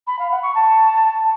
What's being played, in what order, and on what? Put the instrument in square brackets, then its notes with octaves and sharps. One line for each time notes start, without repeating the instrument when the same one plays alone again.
[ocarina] B5
F5
F#5
C#6
A5